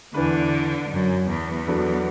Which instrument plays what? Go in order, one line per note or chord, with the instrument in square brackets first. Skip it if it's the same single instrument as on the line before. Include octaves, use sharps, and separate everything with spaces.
[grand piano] E2 E3 D4 B4 [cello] D3
[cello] F#2
E2
[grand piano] F#3 B3 D4 F#4 A4